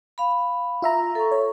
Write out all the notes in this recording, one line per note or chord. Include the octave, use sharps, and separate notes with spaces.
F5 B5
F4 E5 A#5
A4 C#6
C#5